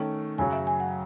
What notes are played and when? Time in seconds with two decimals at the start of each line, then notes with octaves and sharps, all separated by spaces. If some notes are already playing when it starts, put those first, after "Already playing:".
Already playing: D#3 A3 C#4
0.38 F#2 C#3 F#3 G#5
0.53 E5
0.67 G#5
0.80 F#5